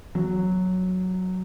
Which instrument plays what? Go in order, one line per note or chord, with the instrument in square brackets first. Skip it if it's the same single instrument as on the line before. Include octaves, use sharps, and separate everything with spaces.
[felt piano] F#3